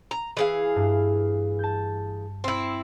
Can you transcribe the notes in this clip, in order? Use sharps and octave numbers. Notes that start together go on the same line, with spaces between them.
A#5
E3 G#4 F5
G2
A5 G6
C4 E4